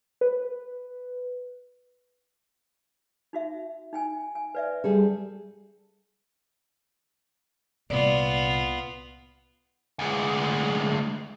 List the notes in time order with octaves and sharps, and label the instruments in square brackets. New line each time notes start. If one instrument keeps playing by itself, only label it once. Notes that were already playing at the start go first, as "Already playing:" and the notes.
[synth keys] B4
[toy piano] D#4 F#4 E5
D#4 G5 G#5
G#5
B4 D5 E5
[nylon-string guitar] G3 G#4 A4
[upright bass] C2 A#2 [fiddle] B3 F4 [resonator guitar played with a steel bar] D5
[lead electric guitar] D2 G#3